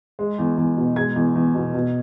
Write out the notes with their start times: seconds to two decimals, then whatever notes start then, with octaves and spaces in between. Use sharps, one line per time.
0.19 G#3
0.38 E2
0.57 E2
0.77 B2
0.96 G#3 G#6
1.16 E2
1.35 E2
1.55 B2
1.74 B2